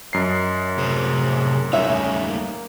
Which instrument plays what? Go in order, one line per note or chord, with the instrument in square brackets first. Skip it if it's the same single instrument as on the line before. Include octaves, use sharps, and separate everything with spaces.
[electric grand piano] F#2 C7 [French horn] D#5
[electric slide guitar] A2 C3 C5 [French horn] G#4
[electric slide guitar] G3 A3 D#4 [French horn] C#4 [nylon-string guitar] E5
[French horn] A#3